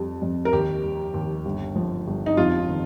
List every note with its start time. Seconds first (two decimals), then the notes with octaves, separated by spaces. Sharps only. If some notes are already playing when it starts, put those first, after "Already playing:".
Already playing: F2 G3
0.22 F2
0.45 A#4
0.53 D#2 G4
0.83 G3
1.14 D#2
1.45 G1
1.76 F3
2.07 G1
2.26 D#4
2.37 F2 F4
2.69 D#3